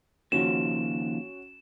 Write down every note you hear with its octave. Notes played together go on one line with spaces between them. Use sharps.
D#2 C#3 F3 C#4 F#4 E7